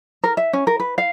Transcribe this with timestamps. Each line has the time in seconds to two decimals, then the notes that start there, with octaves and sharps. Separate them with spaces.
0.24 A#4
0.37 E5
0.53 C#4
0.67 A#4
0.80 B4
0.98 F5